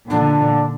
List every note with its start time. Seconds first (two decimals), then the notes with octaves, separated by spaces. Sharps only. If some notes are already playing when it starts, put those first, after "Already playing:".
0.10 A#2 D3 D4